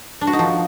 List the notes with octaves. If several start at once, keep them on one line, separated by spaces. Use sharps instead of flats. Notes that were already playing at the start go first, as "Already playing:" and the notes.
D4
F#4
D#4
F3